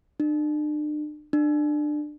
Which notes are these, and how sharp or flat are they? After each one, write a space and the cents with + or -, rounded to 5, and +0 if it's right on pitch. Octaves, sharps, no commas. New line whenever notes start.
D4 +40
D4 +25